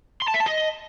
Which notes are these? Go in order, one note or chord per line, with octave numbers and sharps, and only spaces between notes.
C6
A5
E5
A5
D#5